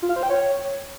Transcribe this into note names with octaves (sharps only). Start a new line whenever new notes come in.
F4
F5
C5
G5
C#5